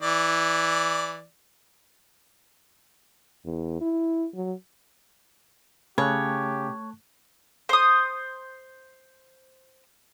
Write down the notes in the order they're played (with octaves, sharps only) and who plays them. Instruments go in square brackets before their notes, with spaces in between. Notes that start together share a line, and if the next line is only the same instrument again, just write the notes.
[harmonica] E3 D5
[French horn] E2
E4
F#3
[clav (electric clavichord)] C#3 [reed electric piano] A3 A5 F#6 [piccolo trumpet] G4 [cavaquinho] C#5
[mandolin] C5 D#6